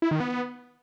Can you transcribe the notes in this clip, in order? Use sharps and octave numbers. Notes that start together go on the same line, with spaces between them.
E4
D#3
B3